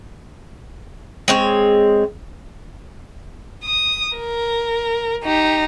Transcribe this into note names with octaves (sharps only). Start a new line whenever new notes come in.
G#3 C4 C#5
D#6
A#4
D#4 G4